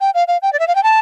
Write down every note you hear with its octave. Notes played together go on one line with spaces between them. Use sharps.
G5
F5
F5
G5
D5
E5
F5
G5
A5